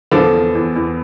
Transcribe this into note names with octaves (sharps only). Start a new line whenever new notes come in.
E2 D3 F3
E2
E2
E2